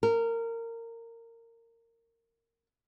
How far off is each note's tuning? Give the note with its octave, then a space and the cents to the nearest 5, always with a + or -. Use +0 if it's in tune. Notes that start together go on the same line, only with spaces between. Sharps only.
A#4 -20